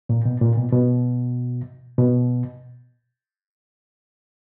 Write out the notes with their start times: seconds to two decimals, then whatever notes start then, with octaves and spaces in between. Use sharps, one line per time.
0.09 A#2
0.25 B2
0.41 A#2
0.57 B2
0.72 B2
1.98 B2